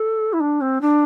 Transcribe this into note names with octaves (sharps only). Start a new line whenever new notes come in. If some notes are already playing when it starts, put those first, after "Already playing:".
Already playing: A4
E4
D4
C4
D4